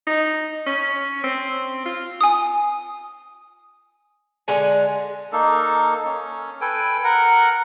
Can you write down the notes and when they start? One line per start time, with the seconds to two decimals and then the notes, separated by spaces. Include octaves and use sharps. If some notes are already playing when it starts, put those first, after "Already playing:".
0.07 D#4
0.67 C#4
1.24 C4
1.86 F4
2.21 G#5 D#6
4.48 D3 G#3 G#5
5.32 A#3 D#4 A4
6.05 C#4
6.61 A4 B4 G5 G#5
7.04 A#4 F#5